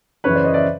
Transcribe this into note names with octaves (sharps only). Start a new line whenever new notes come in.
F#2 C#3 E3 B4 C#5
C5 D5
C#5 D#5
D5 E5